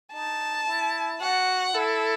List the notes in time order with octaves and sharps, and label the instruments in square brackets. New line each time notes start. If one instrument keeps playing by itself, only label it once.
[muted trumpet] D#4 [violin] A5
[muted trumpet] E4
[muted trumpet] F#4 [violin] F#5
[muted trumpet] E4 [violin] A4